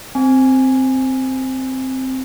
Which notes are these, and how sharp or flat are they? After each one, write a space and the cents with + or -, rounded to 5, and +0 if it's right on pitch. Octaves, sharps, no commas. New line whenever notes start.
C4 +0 G#5 +0